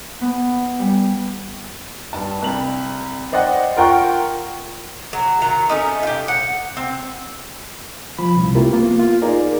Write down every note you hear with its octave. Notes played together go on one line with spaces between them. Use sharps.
B3
G3
G2 A5
C2 F#7
C5 D5 D#5 F#5 G5
F4 A#4 F#5 G5 C#6
F#3
D#3 F#3 A#5
A3 C#4 D#4
F4 G4
F#5
C4
F3 B5
C2
A3 C4 E4 F4 G4 A#4
A#3 B3 F4
F4
D#4 F4 G#4 A#4 D5